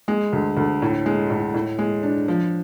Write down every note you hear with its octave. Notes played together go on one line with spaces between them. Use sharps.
G#3
D2
D2
A2
G#3
A2
A2
G#3
D4
F3